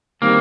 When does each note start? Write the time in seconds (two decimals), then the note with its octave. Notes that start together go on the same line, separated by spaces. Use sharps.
0.22 D#3 G3 A#3 C4